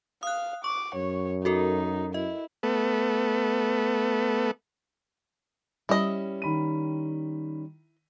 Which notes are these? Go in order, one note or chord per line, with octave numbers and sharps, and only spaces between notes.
F5 D#6 F#6
C#6 D6
F#2 C#5
D#4 F#4 A4 A#4
E4 D#5
A3 B3
G3 C#4 E4 D#5
D#3 B5 D#7